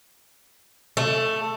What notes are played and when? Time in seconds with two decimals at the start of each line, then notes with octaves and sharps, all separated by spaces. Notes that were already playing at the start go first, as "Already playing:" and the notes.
0.97 A3